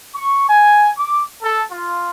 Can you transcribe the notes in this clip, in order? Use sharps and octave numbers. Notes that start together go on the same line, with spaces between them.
C#6
G#5
D6
A4
F4